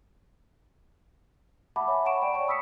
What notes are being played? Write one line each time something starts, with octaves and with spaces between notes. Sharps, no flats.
E5 F#5 A5 B5 D6
C#5 E5 G#5
F#5 A5 B5 C#6 D7 E7
C#5 D5 G5
A5 C#6
B5 D#6 E6 B6 C#7